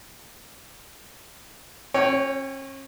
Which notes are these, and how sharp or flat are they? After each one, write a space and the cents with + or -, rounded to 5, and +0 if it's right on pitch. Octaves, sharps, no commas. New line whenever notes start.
C#4 -40 C#5 +0 G5 -15